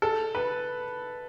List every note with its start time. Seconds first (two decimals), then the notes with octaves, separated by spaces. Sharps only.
0.02 A4
0.35 B4